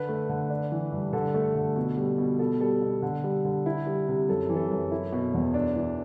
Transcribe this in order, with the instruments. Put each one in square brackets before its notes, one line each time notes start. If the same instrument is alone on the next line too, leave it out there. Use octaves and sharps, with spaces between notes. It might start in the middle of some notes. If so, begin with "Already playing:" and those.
Already playing: [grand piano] D3 B4
A3
D3
D4
E3
G2
D3 A4
A3
D3
B2
G3
B2
B2 A4
G3 A4
B2
D3
G3
D3
E4
G3
C3
F#2 A4
E3
A4
F#2
E4
B2
E2
D4
E3